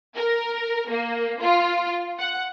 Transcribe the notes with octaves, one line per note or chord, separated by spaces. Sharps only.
A#4
A#3
F4
F#5